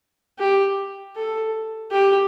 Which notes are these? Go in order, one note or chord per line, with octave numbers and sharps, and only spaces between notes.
G4
A4
G4